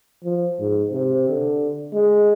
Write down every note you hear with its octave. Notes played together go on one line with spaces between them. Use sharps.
F3
G#2
C3
D3
G#3